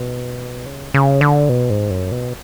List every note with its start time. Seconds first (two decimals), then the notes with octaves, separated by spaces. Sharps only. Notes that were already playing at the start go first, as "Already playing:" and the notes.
Already playing: B2
0.66 C#3
0.94 C#3
1.21 D3
1.49 B2
1.70 G#2
1.90 F#2
2.12 B2